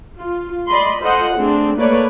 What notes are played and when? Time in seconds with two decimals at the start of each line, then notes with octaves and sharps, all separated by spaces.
0.17 F4
0.68 D5 D#5 B5 C6
1.01 F4 A4 C5 D#5 F#5
1.38 A3 C4 D4 G#4
1.76 A3 A#3 B4 C#5 D5